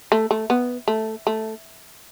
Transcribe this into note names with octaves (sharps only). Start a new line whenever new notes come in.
A3
A3
B3
A3
A3